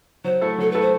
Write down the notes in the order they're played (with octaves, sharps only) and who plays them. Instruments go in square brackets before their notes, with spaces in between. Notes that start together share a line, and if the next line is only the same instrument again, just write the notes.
[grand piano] F#3 [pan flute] C5
[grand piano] A3 E4 A4
[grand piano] F#3 [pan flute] A4
[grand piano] A3 E4 A4 [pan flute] B4
[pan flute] C5